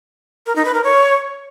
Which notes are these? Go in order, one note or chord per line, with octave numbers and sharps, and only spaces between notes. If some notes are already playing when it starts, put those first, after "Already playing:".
A#4
D#4
B4
A#4
C#5